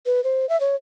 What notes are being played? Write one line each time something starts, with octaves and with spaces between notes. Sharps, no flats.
B4
C5
E5
C#5